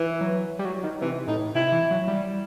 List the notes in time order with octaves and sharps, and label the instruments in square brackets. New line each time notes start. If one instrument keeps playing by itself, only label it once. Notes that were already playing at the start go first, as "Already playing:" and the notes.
Already playing: [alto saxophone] E3
[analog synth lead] F#3
G3
F#3
D#3
[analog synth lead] C3 [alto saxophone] E3
[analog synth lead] A2 [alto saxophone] D#4
[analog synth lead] C3 [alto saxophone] E4
[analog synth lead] E3
F#3
G3